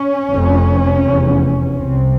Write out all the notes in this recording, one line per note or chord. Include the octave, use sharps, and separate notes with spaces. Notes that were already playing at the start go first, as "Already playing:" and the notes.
Already playing: C#4
F1 F2 C3
F1 E2 C3
C2 C3 C4